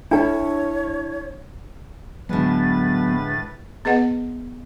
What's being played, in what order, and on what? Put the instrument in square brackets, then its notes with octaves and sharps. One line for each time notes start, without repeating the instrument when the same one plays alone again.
[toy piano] D4 [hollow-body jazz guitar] E4 A4 [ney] C#5
[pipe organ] A2 B4 A6 [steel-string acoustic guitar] D3 G#3 [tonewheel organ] F#3 B3
[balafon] B3 G#4 B4 D#5 F#5